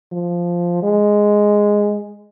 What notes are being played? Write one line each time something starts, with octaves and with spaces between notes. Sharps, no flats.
F3
G#3